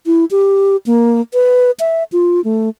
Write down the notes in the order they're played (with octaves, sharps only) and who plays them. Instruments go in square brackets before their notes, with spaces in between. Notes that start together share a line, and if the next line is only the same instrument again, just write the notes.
[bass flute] E4
G4
A#3
B4
E5
F4
A3